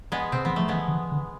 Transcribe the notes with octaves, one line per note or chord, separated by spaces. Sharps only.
G#3 B3
C3 C4
E3 B3
F3 A3
E3 G#3 B3
D3
E3
D3